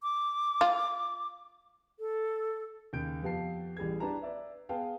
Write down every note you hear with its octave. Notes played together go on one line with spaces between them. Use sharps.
D6
F4
A4
D#2 C#3 G6 D7
F2 B3 G4 F5 A5 C7
A1 G3 G#4 G#6
D4 G4 B4 A5 A#5
B4 D5 E5
B3 G#4 B4 F5 G5 A5